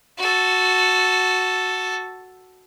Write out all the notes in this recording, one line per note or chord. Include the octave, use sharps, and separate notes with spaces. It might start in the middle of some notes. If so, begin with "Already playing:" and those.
F#4 A4